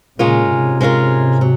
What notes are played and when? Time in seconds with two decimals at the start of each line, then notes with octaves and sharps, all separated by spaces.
0.19 A#2 C#3 G#3 C#4 F4 A#4
0.50 G#2 C3
0.81 G#3 C#4 F4 A#4
1.41 F#3